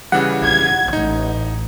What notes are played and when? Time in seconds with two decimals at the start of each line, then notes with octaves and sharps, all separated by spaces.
0.12 C#3 E3 G3 F#5
0.43 G#6
0.93 A1 D#4